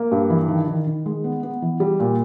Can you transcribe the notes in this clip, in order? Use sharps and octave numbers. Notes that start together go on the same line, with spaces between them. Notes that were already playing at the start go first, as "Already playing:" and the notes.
Already playing: A#3
G2
E3
D#3
D#3
D#3
G#3
B3
B3
E3
G3
A#2